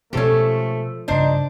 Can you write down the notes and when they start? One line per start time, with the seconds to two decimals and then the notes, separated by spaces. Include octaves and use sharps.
0.13 B2 F3 G#3 A3 C#4 G4 A4
1.08 G2 C#3 D4 D#4 C5